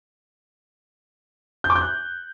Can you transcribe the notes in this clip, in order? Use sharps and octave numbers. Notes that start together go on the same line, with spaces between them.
G6
D6
G6
F#6